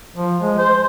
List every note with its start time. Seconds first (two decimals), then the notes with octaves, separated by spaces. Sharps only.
0.16 F3
0.41 G#3
0.58 C5